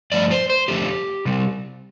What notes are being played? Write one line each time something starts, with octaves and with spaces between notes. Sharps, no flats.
G2 F3 A3 D5
C5
C5
F2 D3 A3 G4
C3 G3